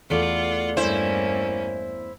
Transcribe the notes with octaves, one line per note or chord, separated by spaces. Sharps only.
E2 A3 F4 D5 F#5
G2 A#3 C#4 E4 C5